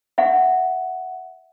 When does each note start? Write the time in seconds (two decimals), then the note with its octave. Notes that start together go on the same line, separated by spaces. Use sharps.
0.18 E5 F#5